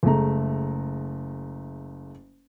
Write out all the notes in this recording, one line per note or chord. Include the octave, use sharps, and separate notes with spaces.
F#1 G#3 A3 A#5